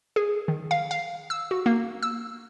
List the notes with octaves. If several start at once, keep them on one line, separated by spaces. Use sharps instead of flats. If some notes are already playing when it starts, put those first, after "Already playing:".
G#4
D#3
F5
F5
E6
F#4
A#3
E6